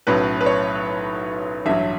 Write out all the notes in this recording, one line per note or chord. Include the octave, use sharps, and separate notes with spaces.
B1 A2 F#3 C#4 B4
B4
C#5
A1 G2 F#3 E5